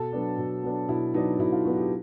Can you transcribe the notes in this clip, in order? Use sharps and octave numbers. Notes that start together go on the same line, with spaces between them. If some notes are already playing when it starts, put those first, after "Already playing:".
Already playing: B2 A4
F#3 B3 D4
B2
F#3 B3 D4
B2 E4
F#3 B3 D4 D#4
B2 E4
F4
F#3 B3 D4 F#4
G4